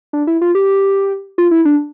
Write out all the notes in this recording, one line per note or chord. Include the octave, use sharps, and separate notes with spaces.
D4
E4
F4
G4
F4
E4
D4